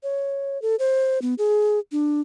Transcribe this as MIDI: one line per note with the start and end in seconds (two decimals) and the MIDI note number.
0.03 0.60 73
0.62 0.76 69
0.79 1.22 72
1.22 1.34 59
1.38 1.79 68
1.92 2.21 62